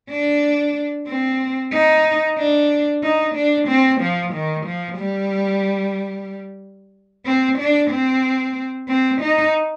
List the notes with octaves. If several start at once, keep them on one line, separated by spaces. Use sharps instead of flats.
D4
C4
D#4
D4
D#4
D4
C4
F3
D#3
F3
G3
C4
D4
C4
C4
D#4